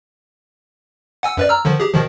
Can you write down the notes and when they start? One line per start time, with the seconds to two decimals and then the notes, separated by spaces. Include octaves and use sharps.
1.23 F#5 G#5 E6
1.37 F#2 B4 D5
1.49 A#5 E6 F6
1.65 D3 D#3 F3
1.80 G4 G#4
1.94 B2 D#3 F3